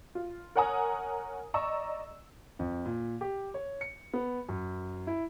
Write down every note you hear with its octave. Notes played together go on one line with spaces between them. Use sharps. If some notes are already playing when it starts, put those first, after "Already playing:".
F4
A#4 C#5 F#5 G#5 A#5 D#6
D5 D#5 A#5 C#6 E6
F2
A#2
G4
C#5
C#7
B3
F#2
E4